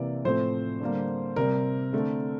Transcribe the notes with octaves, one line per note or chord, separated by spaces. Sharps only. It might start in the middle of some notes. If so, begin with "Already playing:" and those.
Already playing: C3 E3 A#3 D5
A2 F3 A3 C4 C5
D3 G3 A#3
C3 G3 C4 A#4
D3 A3 C4